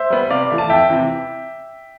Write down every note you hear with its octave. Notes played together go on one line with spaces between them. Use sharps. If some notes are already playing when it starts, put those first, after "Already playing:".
Already playing: C5 E5
G3 B3
C3 D5 F5
E3 A3
A5
F2 E5 G5
C3 E3